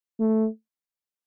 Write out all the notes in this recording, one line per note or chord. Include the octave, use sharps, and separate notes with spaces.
A3